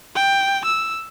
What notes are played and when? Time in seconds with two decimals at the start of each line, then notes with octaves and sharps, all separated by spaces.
0.16 G5
0.65 E6